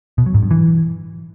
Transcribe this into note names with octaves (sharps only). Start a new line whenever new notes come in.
B2
F#3
G#2
G2
E3